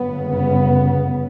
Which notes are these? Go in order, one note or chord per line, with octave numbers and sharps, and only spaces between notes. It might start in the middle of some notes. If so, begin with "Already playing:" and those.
Already playing: G1 F#2 C#3 B3
B3